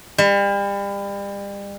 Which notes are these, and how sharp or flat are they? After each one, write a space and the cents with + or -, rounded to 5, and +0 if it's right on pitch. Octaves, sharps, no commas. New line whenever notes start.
G3 +35